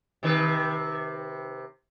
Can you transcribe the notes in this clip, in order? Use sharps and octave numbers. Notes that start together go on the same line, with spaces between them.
C3 D#3 B4